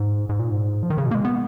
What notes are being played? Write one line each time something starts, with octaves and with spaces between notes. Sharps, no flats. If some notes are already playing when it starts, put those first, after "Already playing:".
Already playing: G#2
G#2
A#2
G#2
F3
D#3
C#3
B2
A#3
G#3
B3